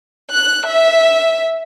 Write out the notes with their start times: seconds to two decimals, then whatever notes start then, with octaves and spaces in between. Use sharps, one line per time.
0.34 F#6
0.68 E5